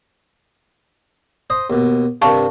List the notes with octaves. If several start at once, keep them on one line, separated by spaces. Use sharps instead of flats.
C5 D#5 D#6
D#2 B2
G2 C3 D#3 F5 A5 C#6